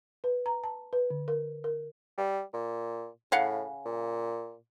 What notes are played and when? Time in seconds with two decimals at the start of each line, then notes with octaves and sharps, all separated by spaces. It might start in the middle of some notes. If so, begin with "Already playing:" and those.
0.24 B4
0.46 A#5
0.64 A5
0.93 B4
1.10 D3
1.28 A#4
1.64 A#4
2.18 G3
2.54 A#2
3.32 A2 C#3 F5 F#5
3.86 A#2